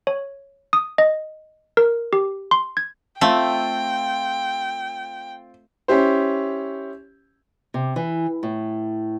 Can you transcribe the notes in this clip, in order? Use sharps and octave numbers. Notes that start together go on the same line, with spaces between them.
C#5
D#6
D#5
A#4
G4
C6
G#6
A3 C4 F4 G5
C#4 E4 G4 C5
C3
E3
A2